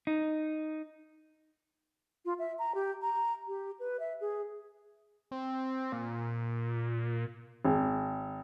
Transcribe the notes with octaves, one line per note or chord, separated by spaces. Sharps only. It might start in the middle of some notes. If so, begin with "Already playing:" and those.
D#4
F4
E5
A#5
G4
A#5
G4
B4
E5
G#4
C4
A#2
G#1